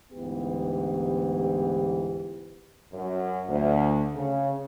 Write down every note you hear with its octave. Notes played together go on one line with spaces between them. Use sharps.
D2 G#2 E3 B3 G4
F#2
D2
C#3